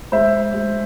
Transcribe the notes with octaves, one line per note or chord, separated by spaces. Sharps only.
G#3 C5 E5
G#3